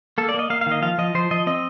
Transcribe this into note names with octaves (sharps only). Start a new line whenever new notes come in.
A#3 A4
D5
A#3 D#5
A#3 F5
F5
D#3
D#5
F3 F5
F3 D#5
F3 C5
F3 D#5
C4 D#5